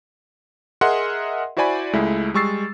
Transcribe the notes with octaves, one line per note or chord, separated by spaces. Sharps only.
G#4 A#4 D#5 E5 F#5 C6
E4 F#4 C5 D5 G#5 B5
C#2 G#3 A3 E4
G3 G#3 C#6 E6 A6 C7